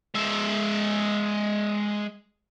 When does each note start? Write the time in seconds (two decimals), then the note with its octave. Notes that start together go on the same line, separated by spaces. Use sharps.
0.15 G#3 E5